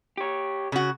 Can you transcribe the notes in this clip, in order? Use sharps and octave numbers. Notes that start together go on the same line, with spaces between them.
G4 C#5
C#3 F#4